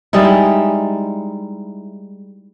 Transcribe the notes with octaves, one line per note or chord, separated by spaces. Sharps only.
G3 G#3 D#4 E4